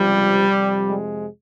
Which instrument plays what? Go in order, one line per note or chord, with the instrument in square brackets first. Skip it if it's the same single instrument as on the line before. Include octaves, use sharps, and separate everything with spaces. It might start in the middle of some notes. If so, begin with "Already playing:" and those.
Already playing: [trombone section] C#2 C3 F3 G3
F2 C3 F3
G#3